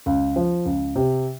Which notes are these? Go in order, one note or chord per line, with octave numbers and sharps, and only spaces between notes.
C#2
F3
C#2
C3